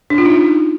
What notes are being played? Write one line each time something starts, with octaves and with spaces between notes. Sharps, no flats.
D4
F4
D#4